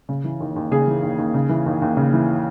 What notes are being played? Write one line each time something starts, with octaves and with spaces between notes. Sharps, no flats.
C#3
E3
D#2
D#2
C#3 G#4
E3
D#2
D#2
C#3
E3
D#2
D#2
C#3
E3